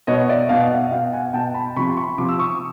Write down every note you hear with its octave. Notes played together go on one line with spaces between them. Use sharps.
B2 C#5 D#5
D5 E5
B2 D#5 F5
E5 F#5
B2 F5 G5
F#5 G#5
B2 G5 A5
A5 B5
C3 F3 B5 C#6
C6
B5 C#6
C3 F3 C6 D6
E6
C#6 D#6